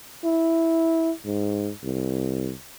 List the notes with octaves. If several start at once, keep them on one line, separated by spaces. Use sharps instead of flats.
E4
G#2
C2